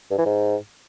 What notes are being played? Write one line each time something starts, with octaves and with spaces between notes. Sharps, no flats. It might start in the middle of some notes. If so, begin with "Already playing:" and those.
G2
E3
G#2